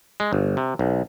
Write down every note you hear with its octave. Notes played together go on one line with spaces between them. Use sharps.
G#3
G1
C3
B1